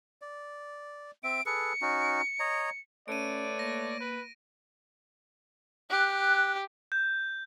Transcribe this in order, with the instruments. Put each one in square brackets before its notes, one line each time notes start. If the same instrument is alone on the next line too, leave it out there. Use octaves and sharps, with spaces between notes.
[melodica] D5
[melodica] C4 E5 [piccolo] D7
[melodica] G#4 A4 B4 [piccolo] C#7
[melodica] C#4 D#4 F#4
C#5 D#5 A#5
[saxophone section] A3 B4 C#5 [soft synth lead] C#4 [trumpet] D5 [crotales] D7 D#7
[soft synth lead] A#3 [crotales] A#6
[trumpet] B4
[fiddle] G4 [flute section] F#6
[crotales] G6